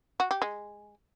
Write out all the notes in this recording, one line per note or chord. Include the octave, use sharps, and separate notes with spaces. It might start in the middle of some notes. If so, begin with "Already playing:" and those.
F#4
G4
G#3